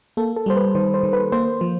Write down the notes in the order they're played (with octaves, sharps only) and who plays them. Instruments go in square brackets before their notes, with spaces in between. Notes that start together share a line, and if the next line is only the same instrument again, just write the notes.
[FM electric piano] A#3 A4
A4
G3 C5
B4
D#3 C5
C5
D#3
B4
A#3 C5
F3